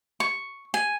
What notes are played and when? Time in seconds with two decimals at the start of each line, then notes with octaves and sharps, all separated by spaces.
0.20 C#6
0.74 G#5